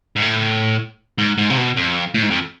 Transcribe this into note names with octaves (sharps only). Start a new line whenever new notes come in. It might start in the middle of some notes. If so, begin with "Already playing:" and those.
G#2
A2
G#2
G#2
C3
B2
F2
A2
G#2
F2